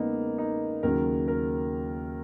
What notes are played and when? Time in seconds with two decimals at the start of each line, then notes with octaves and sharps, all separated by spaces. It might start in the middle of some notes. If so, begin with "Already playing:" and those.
Already playing: E2 C#3 G#3 A#3 B3 D#4
0.38 D#4
0.83 D#2 C#3 F#3 A#4
1.28 A#4